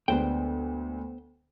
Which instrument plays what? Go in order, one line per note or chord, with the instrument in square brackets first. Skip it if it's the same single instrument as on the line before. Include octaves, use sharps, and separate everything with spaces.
[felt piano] D2 G#3 D4 [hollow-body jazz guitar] B3 C5 G5